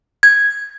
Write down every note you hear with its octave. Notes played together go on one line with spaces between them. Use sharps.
G#6